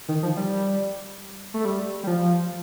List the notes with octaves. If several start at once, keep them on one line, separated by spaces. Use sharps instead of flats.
D#3
F3
G3
A3
G3
G3
F3